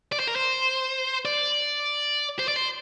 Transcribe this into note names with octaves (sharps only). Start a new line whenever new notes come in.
D5
C5
A#4
C5
D5
C5
D5
C5